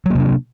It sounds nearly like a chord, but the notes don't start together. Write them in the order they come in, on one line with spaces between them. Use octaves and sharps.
F#3 A#3 C3 D4